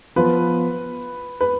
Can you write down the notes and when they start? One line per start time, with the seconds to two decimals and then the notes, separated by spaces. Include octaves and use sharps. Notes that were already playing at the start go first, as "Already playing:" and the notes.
0.16 F3 B3 F4 B4
1.41 B4